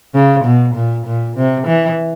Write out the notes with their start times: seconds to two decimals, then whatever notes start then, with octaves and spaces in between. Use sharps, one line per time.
0.14 C#3
0.44 B2
0.74 A#2
1.06 A#2
1.36 C3
1.67 E3